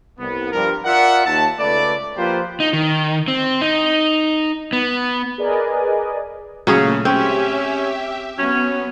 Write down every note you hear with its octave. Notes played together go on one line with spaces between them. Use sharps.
C2 B3
G2 F3 G3 A#4
F4 A#4 D5 E5 F#5
D#2 A5
C#2 A3 B4 D5
F3 A#3 F4 G4 B4 C5
D#4
D#3
C4
D#4
B3
G#4 A#4 B4 D5 D#5 G#5
A#2 C#3 F#3 A3 C#4 G#4
C4 C#4 G4 E5
F#3 B3 C#4